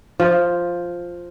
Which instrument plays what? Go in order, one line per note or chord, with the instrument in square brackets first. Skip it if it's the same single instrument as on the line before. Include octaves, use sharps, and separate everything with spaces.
[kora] F3